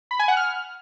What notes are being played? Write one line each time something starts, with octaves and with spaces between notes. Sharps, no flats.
B5
G#5
F#5
F6